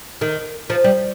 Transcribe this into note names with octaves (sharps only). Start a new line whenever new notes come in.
D#3
F3
G3